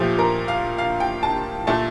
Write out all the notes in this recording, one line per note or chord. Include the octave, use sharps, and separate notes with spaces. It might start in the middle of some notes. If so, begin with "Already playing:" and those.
Already playing: A#2 F3 A3 G4
A#4
F5
F5
G5
A5
A#2 A3 A5